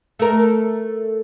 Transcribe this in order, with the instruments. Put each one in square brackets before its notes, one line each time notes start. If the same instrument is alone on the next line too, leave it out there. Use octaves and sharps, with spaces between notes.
[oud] A3 A#4